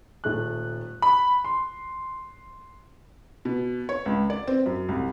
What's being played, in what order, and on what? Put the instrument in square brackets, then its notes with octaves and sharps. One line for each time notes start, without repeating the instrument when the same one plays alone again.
[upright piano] D#1 A3 F#6
B5
C6
[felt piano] B2
C#5
C#2
D5
C4
F#2
C2